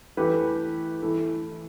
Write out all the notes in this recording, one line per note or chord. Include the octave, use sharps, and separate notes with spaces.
E3 A3 G4 B4
E3 A3 E4